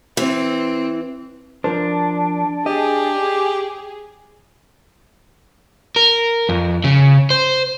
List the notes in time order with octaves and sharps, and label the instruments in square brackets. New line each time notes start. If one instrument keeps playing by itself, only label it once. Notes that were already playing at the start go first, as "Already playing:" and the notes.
[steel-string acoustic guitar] E3 [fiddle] C4
[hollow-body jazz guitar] F3 A#4 C5 [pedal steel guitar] D4
[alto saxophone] G4 [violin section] G#4 [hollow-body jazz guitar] D#5
[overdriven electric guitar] A#4
F2
C#3
C5